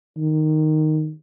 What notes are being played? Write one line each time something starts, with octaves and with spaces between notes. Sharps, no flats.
D#3